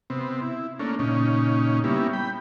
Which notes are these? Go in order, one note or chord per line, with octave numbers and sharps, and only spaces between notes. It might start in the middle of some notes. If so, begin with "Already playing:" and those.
C3 B3 C4
E4
A3 A#3 C#4 D4
A#2 C#3 C#4 D#4
G3 A#3 B3 C#4 E4
G5 B5